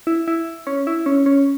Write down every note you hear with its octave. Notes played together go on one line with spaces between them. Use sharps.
E4
E4
C#4
E4
C#4
C#4